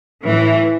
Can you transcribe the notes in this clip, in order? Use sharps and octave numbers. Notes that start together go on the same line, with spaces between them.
A2 E3